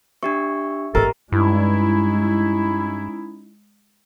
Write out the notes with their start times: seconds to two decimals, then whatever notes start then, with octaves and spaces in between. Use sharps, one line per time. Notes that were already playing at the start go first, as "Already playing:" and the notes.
0.23 D4 G4 E5 C#6
0.95 G#1 A2 G4 A4 A#4 D#5
1.32 G2 G#3 C#4 D#4 E4